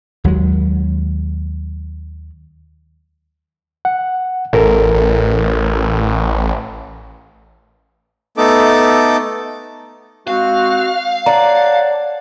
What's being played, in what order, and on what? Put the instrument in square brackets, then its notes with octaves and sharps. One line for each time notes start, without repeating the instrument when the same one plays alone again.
[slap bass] D#2 F#3 G#3
[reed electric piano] F#5
[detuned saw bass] A1 [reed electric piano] A4 A#4
[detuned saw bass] A1
[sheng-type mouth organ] A3 B3 D#4 A4 D6
[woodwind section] G#3 C4 F#4 [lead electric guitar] F5
[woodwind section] C#5 F#5 A5 [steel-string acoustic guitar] D5 [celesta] A#5